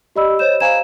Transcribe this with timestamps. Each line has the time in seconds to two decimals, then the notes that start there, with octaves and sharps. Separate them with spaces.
0.16 G4 D5 D#5 B5 E6
0.39 C5 C#5 D#5 G6 E7
0.60 C5 F5 G#5 A#5 G#6 E7